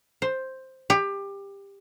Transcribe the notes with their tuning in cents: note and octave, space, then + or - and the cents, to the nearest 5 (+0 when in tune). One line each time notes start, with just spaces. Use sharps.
C5 +5
G4 +20